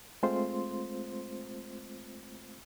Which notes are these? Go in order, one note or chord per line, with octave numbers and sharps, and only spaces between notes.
G#3 A3 C4 F4 C5 C6